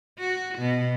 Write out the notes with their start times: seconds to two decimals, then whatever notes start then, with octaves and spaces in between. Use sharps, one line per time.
0.19 F#4
0.58 B2